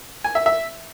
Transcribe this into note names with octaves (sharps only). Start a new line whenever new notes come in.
G#5
E5
E5